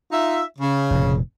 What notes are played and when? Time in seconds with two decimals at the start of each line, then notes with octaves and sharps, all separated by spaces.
0.11 D#4 F4 E5
0.59 C#3
0.91 F1 A#2